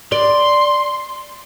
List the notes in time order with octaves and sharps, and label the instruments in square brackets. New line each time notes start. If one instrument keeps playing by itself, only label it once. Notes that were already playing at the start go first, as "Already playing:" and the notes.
[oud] D5 [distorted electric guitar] C6